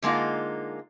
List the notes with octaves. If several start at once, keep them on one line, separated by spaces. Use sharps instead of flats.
D3 G#3 A#3 D#4 F4